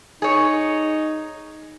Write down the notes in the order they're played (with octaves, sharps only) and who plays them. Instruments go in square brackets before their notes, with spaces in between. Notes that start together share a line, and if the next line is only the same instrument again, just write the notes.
[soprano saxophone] D#4 [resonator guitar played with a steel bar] G#4 C#5